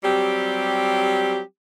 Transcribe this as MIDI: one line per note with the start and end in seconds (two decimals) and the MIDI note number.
0.04 1.40 54
0.04 1.40 55
0.04 1.40 60
0.04 1.40 67